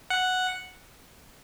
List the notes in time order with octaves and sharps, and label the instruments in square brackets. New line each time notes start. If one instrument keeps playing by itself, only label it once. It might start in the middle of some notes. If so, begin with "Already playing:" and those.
[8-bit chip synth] F#5